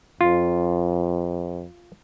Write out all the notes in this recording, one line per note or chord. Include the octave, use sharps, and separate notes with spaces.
F2 F4